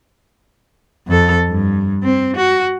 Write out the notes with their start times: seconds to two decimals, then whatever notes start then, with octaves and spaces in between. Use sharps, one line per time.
1.07 F2 A4
1.49 G2
2.03 C4
2.37 F#4